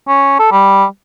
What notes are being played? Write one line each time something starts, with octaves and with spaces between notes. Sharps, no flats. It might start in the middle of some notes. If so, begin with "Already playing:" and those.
C#4
A4
G3